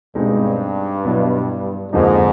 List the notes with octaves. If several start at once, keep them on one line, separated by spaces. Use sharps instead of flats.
G2 B2 G#3 C4 D#4 G#4
B2 F#3 B3 E4
F2 G#2 D3 F3 A#3 D#4